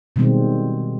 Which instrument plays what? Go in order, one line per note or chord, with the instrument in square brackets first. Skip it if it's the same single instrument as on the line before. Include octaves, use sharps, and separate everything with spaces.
[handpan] B2 D#3 G3 G#3 C4